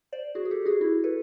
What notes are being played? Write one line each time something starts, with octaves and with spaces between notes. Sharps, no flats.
C5 D5
F#4 G#4
G#4
G4 A4
F#4 G#4
E4 F#4
A4 B4